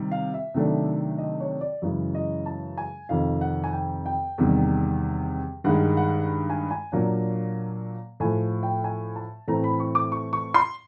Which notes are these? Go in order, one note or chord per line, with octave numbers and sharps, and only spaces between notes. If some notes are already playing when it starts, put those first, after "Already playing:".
Already playing: C3 D#3 G3
F5
E5
C3 D#3 F#3 A3 D4
D#5
C#5
D5
F#2 C#3 E3 G#3
D#5
A5
G#5
F2 C3 D#3 F5
F#5
G#5
G5
G5
E2 C3 D#3 G3
G2 D#3 G#3 F#5
F#5
G#5
G#5
A#2 F#3 A#3 D4
A2 F3 A3 G#5
G5
G#5
A5
A2 E3 A3 C4 A#5
B5
C#6
D6
C#6
C#6
C6